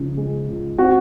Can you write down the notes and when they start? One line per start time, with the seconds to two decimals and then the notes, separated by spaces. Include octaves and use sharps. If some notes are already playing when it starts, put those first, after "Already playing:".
Already playing: C#2 C#3 F3 G#3
0.17 G#3
0.48 C#2
0.78 C4 F#4